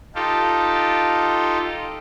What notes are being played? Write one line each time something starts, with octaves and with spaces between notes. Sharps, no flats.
D#4 F4 G4 A4